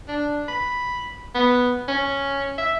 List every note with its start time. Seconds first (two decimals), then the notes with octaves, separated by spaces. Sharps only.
0.08 D4
0.48 B5
1.35 B3
1.88 C#4
2.58 E5